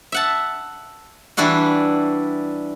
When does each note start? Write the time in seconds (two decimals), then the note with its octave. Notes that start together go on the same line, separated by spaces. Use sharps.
0.12 E5 F#5 A5
1.37 E3 G3 D4 E4 F#4